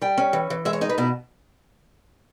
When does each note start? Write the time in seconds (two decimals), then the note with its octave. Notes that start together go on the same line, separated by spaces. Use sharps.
0.02 G3 G5
0.18 C#4
0.33 E3
0.50 E3
0.65 G#3 E5
0.73 C#5
0.81 D#4 D#5
0.89 B4
0.98 B2 E4